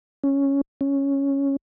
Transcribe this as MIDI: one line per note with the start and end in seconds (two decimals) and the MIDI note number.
0.24 0.61 61
0.81 1.56 61